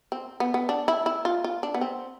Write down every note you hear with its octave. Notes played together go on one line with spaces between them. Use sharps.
C4
B3
B3
D4
E4
E4
F4
F4
D4
B3
C4